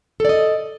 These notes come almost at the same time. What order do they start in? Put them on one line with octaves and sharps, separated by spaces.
A4 D5 D#5